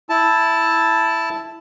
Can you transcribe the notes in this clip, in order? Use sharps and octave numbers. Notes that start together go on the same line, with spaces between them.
E4 A5